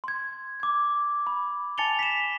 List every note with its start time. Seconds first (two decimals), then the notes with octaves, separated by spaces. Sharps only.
0.04 C6 G#6
0.60 D6 G#6
1.27 B5
1.78 G#5 A5 A6 C#7 F7 G7
1.99 B6 E7